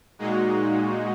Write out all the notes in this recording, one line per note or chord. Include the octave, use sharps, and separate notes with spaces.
A#2 G#3 D#4 F#4